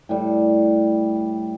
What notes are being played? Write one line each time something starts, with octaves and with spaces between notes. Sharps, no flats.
A2 G3